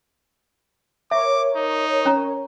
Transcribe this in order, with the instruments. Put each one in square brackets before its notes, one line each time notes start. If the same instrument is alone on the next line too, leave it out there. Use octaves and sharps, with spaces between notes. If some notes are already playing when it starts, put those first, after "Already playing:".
[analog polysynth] A#4 C#5 [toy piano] E5 [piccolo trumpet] D6
[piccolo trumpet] D#4
[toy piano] C#4 A#5